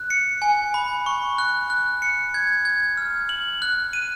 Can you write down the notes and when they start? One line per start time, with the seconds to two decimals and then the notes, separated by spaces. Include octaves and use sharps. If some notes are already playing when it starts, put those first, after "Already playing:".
Already playing: F#6
0.10 C#7
0.42 G#5
0.74 B5
1.06 C#6
1.38 F#6
1.70 F#6
2.02 C#7
2.34 G#6
2.65 G#6
2.97 F6
3.29 F#7
3.62 F#6
3.93 D#7